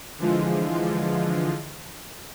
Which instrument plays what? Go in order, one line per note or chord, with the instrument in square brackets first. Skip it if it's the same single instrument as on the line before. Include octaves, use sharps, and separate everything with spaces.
[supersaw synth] D3 E3 F3 G#3 F4